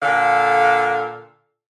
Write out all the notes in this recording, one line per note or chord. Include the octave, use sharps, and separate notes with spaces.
A#2 D3 A4 F5